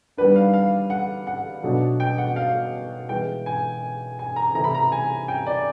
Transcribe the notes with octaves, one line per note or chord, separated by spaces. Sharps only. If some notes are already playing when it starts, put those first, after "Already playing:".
D#3 G3 B3 D4 B4
F5
F5
F#5
F#5
B2 F#3 A3 D4
G5
F#5
F5
E3 G#3 B3 G5
G#5
G#5
A#5
C3 E3 A3 C4 E4 A#5
B5
A#5
G#5
G5
D5